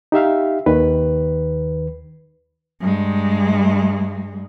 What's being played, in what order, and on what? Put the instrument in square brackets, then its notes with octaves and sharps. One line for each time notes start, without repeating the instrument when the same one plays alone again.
[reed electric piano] D#4 G4 E5 F5
D#2 D#3 B4
[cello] G2 G#3